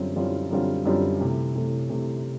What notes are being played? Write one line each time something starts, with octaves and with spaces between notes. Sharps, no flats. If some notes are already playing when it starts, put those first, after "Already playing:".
Already playing: F#2 D3 G3 C4 F4
F#2 D3 G3 C4 F4
F#2 D3 G3 C4 F4
F#2 D3 G3 C4 F4
C3 E3 A3
C3 E3 A3
C3 E3 A3